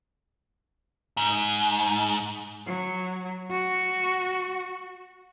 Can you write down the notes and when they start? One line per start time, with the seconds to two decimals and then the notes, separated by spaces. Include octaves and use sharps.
1.17 G#2
2.66 F#3
3.51 F#4